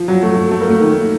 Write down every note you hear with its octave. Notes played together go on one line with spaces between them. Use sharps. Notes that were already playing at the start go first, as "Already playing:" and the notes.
Already playing: F3
F#3
A3
A3
A3
A#3
A3
D#3